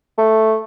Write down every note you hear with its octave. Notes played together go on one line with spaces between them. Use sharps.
A3